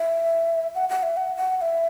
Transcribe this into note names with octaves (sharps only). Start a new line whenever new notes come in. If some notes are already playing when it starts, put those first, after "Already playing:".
Already playing: E5
F#5
F#5
E5
F#5
F#5
F#5
E5